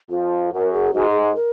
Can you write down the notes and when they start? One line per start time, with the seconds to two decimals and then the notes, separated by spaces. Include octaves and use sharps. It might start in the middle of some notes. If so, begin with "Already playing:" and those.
0.10 F2 F3 F4
0.52 F#2 F#3 A#4
0.73 G#4
0.94 G#2 G#3 F#4
1.09 G#4
1.22 G#4
1.36 A#4